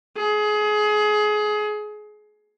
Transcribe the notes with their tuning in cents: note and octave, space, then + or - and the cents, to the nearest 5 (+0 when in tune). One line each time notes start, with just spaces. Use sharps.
G#4 +25